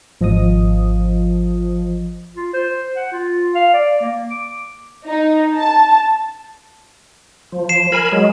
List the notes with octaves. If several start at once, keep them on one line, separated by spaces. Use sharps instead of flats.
G#1 F3 D#5 D#6
F4
C5
F#5
F4
F5
D5
A#3
D6
D#4
A5
F3
C7 E7
A#4 G#5 B5
F#3 G#3